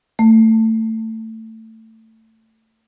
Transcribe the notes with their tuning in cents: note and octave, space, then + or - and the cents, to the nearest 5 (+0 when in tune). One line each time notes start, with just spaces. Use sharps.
A3 +20